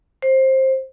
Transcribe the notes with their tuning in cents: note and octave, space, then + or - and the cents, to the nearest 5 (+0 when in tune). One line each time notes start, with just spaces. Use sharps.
C5 +15